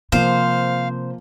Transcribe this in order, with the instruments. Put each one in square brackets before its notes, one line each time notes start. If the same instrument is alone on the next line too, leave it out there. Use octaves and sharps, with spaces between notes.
[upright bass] C3 [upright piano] F3 A#3 [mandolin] C5 [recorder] F5